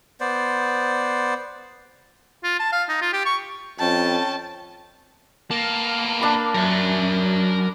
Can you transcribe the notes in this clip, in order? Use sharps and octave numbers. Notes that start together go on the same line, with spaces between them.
B3 C5 D5
F4
A5
F5
D#4
F4
G4
C#6
F2 C#4 G5 A5
A#3 B3 A5
D4 B5
F#2 A#4 E5